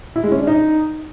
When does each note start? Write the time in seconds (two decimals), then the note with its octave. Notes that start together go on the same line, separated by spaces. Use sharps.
0.16 E4
0.24 G#3
0.32 C#4
0.39 D4
0.47 D#4